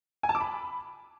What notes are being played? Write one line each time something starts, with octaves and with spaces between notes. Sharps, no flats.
G#5
A5
D6
B5